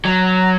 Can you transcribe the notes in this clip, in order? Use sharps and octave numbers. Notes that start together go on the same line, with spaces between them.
F#3